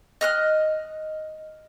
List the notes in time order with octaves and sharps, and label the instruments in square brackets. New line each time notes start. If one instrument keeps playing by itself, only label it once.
[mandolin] D#5 F6 F#6